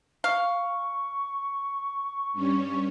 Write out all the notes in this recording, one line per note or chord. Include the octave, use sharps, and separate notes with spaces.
F5 C#6
G2 G3 C#4